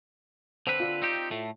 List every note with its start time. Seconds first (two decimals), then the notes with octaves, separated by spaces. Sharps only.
0.67 D3 C4 B4 C5
0.80 F4 D5
1.02 C4 D#4 G4
1.31 A2 A3